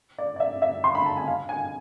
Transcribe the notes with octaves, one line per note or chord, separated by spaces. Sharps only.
D5
D5
E5
E5
C6
B5
A5
G#5
F5
G#5